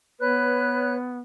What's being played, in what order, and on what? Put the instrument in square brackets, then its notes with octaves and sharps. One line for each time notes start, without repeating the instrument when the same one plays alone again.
[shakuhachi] B3 [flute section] B4 C#5 F#6